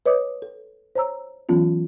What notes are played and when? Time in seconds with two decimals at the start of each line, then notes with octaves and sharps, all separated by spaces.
0.06 B4 C#5 D#5 D6 D#6
0.42 A4
0.95 C5 C#5 A#5 E6
1.49 E3 F#3 B3 C#4 F4